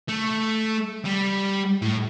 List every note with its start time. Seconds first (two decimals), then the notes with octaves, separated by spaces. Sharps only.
0.09 A3
1.05 G3
1.82 A2